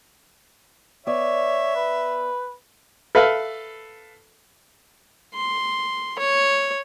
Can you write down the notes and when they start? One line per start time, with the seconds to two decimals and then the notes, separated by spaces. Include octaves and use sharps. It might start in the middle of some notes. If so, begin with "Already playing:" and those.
1.07 B3 C#5 D5 E5
1.76 B4
3.15 A4 B4 E5 F5
5.34 C6
6.18 C#5